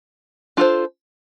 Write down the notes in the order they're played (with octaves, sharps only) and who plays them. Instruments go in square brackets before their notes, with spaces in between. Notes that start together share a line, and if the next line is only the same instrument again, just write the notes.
[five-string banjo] D4 F4 A4 C5